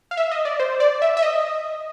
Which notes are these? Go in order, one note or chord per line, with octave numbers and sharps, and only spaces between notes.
F5
E5
D#5
D5
C5
D5
E5
E5
D#5